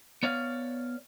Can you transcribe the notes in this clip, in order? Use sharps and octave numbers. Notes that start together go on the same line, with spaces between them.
B3 C#5 D5 F5